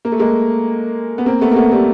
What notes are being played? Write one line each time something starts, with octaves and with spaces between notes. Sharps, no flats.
A#3
A3
G#3 A#3
B3
A#3 C4
A3 B3
A#3
A3 B3
G3 A3